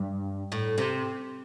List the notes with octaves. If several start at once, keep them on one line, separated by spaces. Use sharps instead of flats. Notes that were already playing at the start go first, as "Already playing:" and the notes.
Already playing: G2
A2
C3